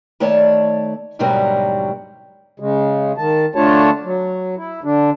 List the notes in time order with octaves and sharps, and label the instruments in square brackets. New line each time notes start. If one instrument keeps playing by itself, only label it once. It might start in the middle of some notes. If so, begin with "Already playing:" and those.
[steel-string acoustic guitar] D#3 A3 C#5 D5 A5
D2 G#2 B2 F#3 G3 A#4
[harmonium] C#3 G#3
D#3 A5
D3 A3 D4 F4 C#5 A5
F#3
E4
D3 D4